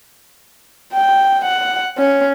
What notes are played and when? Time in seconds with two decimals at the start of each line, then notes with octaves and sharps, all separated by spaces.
0.94 G5
1.44 F#5
1.98 C#4